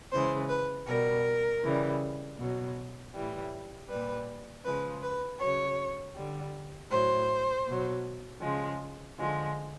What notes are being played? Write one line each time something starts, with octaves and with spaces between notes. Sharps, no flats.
C#3 E3 G#3 C5
B4
B2 G3 A#4
C#3 E3 G3
B2 F#3
A2 E3 G3
A#2 G3 B4
C#3 F3 G#3 B4
B4
C#3 F#3 C#5
D3 G3
A2 F#3 C5
B2 F#3
C#3 F3 G#3
D3 F3 G#3